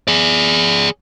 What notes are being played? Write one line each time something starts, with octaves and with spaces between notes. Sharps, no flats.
G#4 D5